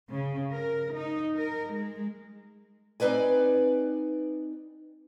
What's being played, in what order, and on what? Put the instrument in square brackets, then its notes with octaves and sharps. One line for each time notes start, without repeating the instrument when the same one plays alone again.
[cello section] C#3
A#4
D#4
A#4
G#3
[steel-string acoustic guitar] C4 D#4 B4 D5 G#5